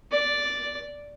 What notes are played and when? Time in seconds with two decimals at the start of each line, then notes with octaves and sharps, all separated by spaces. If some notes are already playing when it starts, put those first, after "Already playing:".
0.11 D5